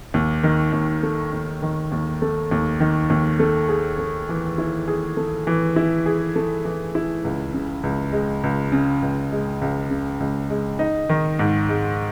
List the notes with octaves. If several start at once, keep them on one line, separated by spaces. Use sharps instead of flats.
D#2
D#3
D#2
A3
D#2
D#3
D#2
A3
D#2
D#3
D#2
A3
G#4
A3
E3
E4
G#4
A3
E3
E4
G#4
A3
E3
E4
C#2
C#3
C#2
G#3
C#2
C#3
C#2
G#3
C#2
C#3
C#2
G#3
D#4
D#3
G#2
G#3